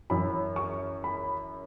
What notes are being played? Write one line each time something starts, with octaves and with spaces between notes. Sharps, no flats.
F#2 E3 B5
C#6
B5